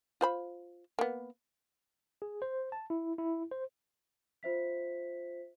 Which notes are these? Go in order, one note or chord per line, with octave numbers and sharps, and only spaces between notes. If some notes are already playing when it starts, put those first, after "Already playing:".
F4 C5 B5
A#3 B3
G#4
C5
A5
E4
E4
C5
F4 C5 E5 B6